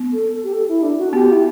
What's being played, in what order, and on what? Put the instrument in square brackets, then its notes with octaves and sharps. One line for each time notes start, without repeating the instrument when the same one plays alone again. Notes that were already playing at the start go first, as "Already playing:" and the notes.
Already playing: [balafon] B3
[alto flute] A4
G4
A4
E4
D4
F#4
[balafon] B3 [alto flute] G4
[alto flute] E4